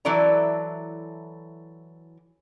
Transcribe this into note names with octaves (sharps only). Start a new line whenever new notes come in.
E3 F#3 E4 A4 D5 A#5